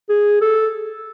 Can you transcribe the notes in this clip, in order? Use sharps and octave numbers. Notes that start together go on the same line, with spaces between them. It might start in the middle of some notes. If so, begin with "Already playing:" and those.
G#4
A4